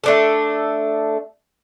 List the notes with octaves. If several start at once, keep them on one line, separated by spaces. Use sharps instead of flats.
A3 D4 A4